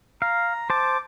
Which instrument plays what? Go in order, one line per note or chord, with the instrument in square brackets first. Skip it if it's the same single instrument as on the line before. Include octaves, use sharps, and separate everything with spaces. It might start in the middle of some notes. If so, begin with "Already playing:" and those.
[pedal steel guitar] F5 [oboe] A#5
[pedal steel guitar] C5 A5 [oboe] D6